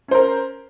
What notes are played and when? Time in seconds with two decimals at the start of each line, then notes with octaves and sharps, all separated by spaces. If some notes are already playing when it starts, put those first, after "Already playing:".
0.08 C#4
0.11 C5
0.14 A#4